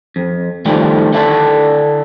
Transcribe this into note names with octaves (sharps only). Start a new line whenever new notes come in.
F2
A2 D#3 F3 G3 A3
D3 D4 E4 A4